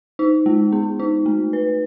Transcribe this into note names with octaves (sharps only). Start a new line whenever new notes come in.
D#4
G#3
B3
D#4
A3
B4